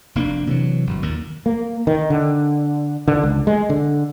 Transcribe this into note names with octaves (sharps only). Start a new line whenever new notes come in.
F1 A#3 C#4 D4
C3 E3 F#3
G1 F#2
D#2 A#2
A#3
D#3
D3
D3
C#2
G#3
D3